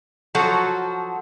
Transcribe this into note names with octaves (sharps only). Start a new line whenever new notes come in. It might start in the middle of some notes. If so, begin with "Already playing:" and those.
F3 F#3 F#4 A4